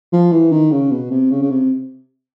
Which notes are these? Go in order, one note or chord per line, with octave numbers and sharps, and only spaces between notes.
F3
E3
D#3
C#3
B2
C3
C#3
C#3
C3